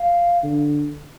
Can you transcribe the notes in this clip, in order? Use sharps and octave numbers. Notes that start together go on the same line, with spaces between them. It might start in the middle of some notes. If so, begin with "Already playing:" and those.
Already playing: F5
D3